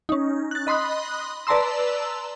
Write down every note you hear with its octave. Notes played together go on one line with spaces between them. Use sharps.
C#4 D#4
F#6 A6
D#5 B5 C6 D#6 F#6
B4 D5 A5 A#5 C6 E6